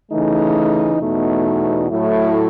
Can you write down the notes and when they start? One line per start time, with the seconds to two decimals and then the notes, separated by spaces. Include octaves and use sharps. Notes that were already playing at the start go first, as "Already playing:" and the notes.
0.11 C#3 E3 A3 D#4
1.00 E2 B2 A3 D#4
1.88 A2 F#3 A3 E4